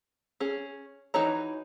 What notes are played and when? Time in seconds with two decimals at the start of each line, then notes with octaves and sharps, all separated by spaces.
0.40 C#4 G#4
1.14 E3 D#4 F#4 C#5 A#5